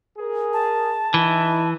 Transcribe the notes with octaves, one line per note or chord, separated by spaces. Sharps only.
G#4 A#4
A5
E3 D#4 E4